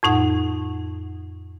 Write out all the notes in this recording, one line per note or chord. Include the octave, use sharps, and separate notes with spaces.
F2 A2 D#4 F#5